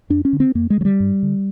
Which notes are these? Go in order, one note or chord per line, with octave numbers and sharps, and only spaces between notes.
F2 D4
C#4
D3
C4
F2 A#3
G#3
D3 F#3
G3
G2
D3